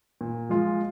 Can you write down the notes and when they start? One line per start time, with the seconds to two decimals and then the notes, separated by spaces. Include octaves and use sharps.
0.21 A#2
0.49 F3 G#3 F4